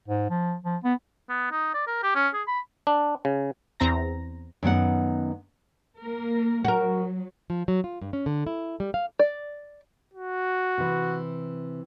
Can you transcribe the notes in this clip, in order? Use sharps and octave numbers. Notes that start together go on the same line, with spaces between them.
G#2
F3
F3
B3
B3
D#4
D5
A#4
G4
C#4
G#4
B5
D4
C#3
E2 C4 A#5 A#6
F#2 D#3 B3 F#5
A#3 A#4
F#3 F#4 A#4
F3
F#3
F4
G2
C#4
D3
E4
G3
F5
D5
F#4
C3 E3